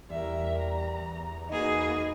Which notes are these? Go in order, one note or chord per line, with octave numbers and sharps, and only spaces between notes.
E2 G3 A#4 E5
A#5
A#3 D#4 F#4 G#4 B4